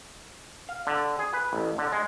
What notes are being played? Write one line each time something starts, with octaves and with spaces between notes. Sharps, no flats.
F5
D3
G#4
B4
A1
D3
G#3